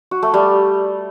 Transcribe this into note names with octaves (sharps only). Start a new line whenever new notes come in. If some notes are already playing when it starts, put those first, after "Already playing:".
F#4
A3
G3